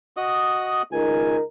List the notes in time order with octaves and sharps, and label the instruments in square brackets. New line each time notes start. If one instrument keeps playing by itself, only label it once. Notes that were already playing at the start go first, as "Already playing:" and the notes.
[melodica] F#4 D#5 D#6
[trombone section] C#2 D#4 A#4 [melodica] G#5